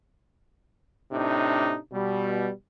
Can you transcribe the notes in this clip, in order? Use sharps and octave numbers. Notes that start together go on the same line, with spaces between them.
A2 C3 D4 D#4
B2 G3